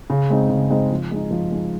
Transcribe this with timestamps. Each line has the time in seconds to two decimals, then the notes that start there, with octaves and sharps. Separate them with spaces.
0.10 C#3
0.30 G#3 C4 D#4
0.50 C#3
0.70 G#3 C4 D#4
0.91 F3
1.11 G#3 D#4
1.31 F3
1.52 G#3 D#4